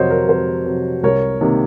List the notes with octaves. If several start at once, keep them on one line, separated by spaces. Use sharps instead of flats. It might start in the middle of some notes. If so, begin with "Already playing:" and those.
Already playing: F2 C3 F#3 A#4 C5 C#5 D#5
A#4
F2 C5
C3 F#3
C2 A#4 C#5
C3 D#3 A#3